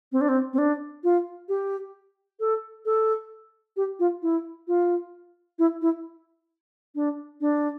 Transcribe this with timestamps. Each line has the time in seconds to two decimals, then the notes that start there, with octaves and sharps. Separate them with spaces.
0.12 C4
0.21 D4
0.28 C4
0.53 C4
0.58 D4
1.04 F4
1.48 G4
2.40 A4
2.85 A4
3.76 G4
3.99 F4
4.22 E4
4.68 F4
5.59 E4
5.82 E4
6.95 D4
7.41 D4